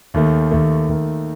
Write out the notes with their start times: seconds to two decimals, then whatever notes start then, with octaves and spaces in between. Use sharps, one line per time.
0.14 D#2 D#3 A3
0.51 D#2 D#3 A3
0.88 D#2 D#3 A3